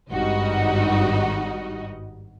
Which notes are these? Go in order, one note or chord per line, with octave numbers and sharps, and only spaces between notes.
G#1 G2 G3 D#4 F#4 D#5